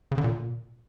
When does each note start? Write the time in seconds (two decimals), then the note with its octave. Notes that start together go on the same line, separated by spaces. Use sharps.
0.12 C#3
0.18 D3
0.24 A#2